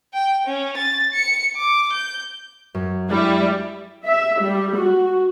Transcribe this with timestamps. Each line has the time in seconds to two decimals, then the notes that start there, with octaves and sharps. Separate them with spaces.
0.14 G5
0.47 C#4
0.77 A6
1.14 C#7
1.56 D6
1.93 G6
2.75 F#2
3.10 G3 G#3 D4 E4
4.05 E5
4.42 G3
4.76 F#4